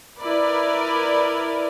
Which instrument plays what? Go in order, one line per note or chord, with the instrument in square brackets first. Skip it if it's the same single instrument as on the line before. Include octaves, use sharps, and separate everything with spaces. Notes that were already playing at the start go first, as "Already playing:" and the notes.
[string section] E4 A#4 B4 D5